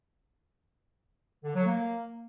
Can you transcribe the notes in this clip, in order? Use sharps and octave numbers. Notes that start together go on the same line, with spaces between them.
D3
F#3
A#3